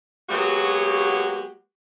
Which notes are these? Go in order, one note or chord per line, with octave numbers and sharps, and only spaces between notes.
F#3 G#3 A#3 B3 F#4 G4